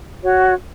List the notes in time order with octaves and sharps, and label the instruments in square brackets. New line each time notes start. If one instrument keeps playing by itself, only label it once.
[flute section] F#4 C#5